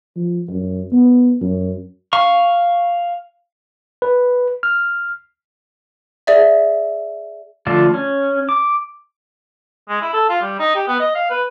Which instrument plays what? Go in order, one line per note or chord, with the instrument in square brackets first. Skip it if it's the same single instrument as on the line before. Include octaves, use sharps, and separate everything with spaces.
[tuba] F3
F#2
B3
F#2
[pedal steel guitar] F5 C#6
[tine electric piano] B4
F6
[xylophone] G#4 D5 E5
[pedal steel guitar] D3 F3 A3 D4 F4
C#4
D6
[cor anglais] G#3
E4
A4
F4
G3
D#4
G4
B3
D#5
F5
B4